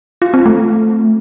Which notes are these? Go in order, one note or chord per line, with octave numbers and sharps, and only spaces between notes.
F4
C4
A3